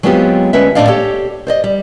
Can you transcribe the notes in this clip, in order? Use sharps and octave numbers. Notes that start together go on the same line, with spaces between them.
F#3 G#3 B3 C4 F4 G4
D2 G#3 C#4 B4 E5
A2 A#3 D4 D5 D#5 F5
G4 A4 C#5
C5 D5 D#5
G3